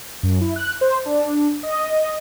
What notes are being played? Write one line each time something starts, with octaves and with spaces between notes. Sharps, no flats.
F#2
E4
F#6
C5
D4
D#5